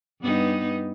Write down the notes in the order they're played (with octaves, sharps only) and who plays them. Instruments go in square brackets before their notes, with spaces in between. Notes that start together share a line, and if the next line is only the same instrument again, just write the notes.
[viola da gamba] G2 B3 D#4